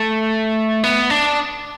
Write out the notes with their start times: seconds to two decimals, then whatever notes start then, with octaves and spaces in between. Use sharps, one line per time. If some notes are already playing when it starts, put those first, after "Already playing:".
Already playing: A3
0.84 B3
1.10 D4